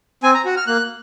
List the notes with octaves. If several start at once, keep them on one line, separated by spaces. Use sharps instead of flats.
C4 G#5
A#5
F#4
F6
A#3 F#6